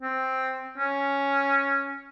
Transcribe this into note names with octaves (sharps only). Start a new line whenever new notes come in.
C4
C#4